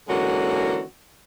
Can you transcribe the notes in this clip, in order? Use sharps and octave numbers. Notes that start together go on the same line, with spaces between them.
D3 E3 G#3 A#3 C#4 F#4